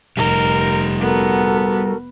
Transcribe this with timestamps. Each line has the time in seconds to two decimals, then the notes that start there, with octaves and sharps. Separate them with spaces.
0.17 F1 G3 D#4 A#4
1.00 B3 F#4 A4 A#4